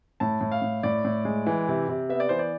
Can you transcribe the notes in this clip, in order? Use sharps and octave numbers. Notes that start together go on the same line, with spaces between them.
A2 A5
A2
F5
A2
A2 D5
A2
G#3
E3
C3
C3
B3 E5
D5
E3 C5
D5